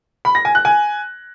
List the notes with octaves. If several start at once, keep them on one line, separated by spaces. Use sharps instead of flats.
B5
A#6
G#5
F#6
G#5